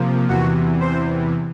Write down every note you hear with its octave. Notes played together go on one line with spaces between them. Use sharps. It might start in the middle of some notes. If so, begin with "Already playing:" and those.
Already playing: C3 F3 A#3
E2 C3 E3 F#4
C5